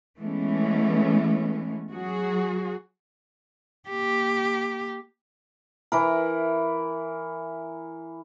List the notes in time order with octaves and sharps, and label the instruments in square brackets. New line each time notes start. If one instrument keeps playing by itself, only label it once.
[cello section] E3 G#3 A3 B3 C#4
F#3 F#4 G#4
[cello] A#3 G4
[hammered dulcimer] E3 E4 A#4